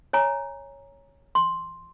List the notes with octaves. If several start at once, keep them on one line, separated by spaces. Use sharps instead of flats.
C#5 G#5 A#5
C6